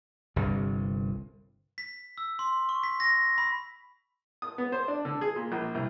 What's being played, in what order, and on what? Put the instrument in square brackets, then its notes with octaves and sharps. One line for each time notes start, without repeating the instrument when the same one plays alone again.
[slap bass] G1 C2 G2
[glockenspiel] B6
E6
C6
C#6
B6
A#6
B5
[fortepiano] D#6
B3
C5
D4
D3
G#4
A#2
A#1
C2